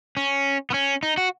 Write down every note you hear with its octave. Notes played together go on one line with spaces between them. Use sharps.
C#4
B3
C#4
D#4
F#4